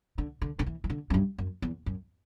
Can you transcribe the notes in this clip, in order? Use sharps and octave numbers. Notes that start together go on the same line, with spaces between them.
D3
D3
D3
E3
E3
D3
F#2
G2
F#2
E2
F#2